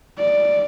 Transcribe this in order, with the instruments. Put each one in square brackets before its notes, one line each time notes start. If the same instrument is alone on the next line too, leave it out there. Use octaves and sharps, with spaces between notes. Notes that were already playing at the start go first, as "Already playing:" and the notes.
[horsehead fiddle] D5